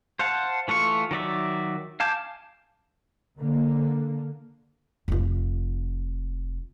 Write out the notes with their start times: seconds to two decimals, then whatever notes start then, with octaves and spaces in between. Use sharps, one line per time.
0.19 C5 F5 F#5 A5
0.68 E3 A3 F4 C#6
1.11 D#3 F#3 D5 E5
2.00 F5 G#5 A5 D6 G6
3.40 D3 A#3
5.08 F1 F4